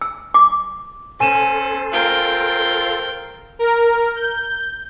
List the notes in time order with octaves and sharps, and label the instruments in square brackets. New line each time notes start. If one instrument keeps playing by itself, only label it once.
[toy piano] E6
D6
[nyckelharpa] C#4 [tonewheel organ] A4 C5 [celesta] G#5 D#7 E7
[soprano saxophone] F4 [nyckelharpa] A#4 G5
[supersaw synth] A#4
G6